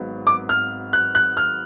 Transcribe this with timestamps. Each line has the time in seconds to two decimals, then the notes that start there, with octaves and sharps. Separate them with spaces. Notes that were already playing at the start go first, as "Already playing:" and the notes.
Already playing: G#1 G#2 F#3 B3
0.27 D6
0.49 F6
0.93 F#6
1.15 F#6
1.37 F6